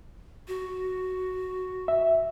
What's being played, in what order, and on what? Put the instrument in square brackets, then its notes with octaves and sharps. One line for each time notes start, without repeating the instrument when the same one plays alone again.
[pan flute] F#4
[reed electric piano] E5